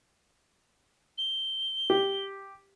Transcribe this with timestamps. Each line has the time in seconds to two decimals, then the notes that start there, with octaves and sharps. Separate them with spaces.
1.17 G7
1.90 G4